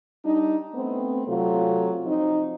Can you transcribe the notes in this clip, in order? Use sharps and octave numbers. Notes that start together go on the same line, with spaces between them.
G3 D4 D#4
A3 B3 C4
C3 F#3 A3 F4
F3 C4 D#4